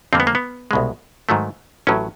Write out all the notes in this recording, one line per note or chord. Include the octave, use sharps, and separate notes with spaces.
F2 D3 G3 A#3 C4
B3
A#3
B3
C2 B2 G#3
G#2 D#3 F#3 A3
A1 A2 F#3 C#4